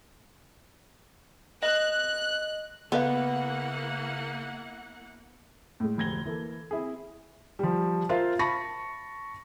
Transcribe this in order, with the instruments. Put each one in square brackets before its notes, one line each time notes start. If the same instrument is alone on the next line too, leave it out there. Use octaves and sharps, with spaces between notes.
[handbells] D#5 [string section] F#6
[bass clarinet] C#3 [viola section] A#3 E4 F#5 [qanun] B3 [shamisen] A4 B4 F5
[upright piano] A2 G#3
F1 D2 G#6 A#6 G7
E3 A#3 A4
C4 E4 G#4
[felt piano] F3 G3
F4 A#4 C5 E5 F5
A5 B5 C#6 A#6